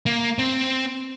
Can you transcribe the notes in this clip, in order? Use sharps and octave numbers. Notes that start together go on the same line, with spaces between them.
A#3
C4